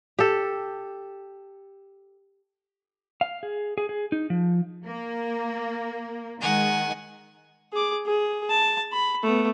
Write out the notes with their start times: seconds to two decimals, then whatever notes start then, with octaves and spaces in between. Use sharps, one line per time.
0.19 G4 A4
3.21 F5
3.43 G#4
3.78 G#4
3.89 G#4
4.12 D#4
4.30 F3
4.85 A#3
6.41 D#3 G#3 F#5 G#5
7.73 G#4 D6
8.06 G#4
8.50 A5
8.92 B5
9.23 A3 B3